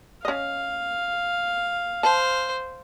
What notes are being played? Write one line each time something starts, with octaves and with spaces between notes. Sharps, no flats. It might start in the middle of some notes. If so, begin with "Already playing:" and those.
C#4 D#5 F5
C5 A5